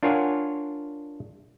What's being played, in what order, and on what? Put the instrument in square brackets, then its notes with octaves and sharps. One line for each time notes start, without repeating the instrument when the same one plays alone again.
[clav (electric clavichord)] D4 F4 A#4 C#5 F#5 G#5